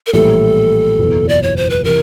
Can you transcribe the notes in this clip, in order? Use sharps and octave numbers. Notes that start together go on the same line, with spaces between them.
A#4
A#1 A2 E3 G3 A4
F#1 E2 B2
D5
C#5
C5
B4
C3 E3 A#4